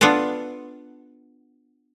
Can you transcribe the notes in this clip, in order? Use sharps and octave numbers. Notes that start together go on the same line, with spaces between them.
B3 D4 F4 A4 B4